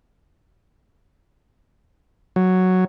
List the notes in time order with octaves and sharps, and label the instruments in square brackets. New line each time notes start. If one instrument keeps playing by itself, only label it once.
[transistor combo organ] F#3